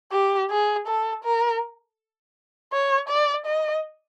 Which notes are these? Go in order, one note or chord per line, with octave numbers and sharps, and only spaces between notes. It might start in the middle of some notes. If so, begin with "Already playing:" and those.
G4
G#4
A4
A#4
C#5
D5
D#5